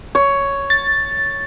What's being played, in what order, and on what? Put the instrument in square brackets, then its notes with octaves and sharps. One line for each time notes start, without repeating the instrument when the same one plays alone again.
[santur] C#5
[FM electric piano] A6